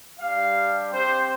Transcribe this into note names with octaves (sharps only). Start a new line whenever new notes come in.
G3 D4 G4 F5
C4 G4 C5